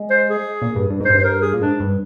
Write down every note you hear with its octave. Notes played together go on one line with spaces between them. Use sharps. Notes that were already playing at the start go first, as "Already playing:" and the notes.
Already playing: G#3
C5
G#4
A#2
G2
G2
G#2 C5
G2
C5
A#4
G#4
A#2
G#2 D4
G2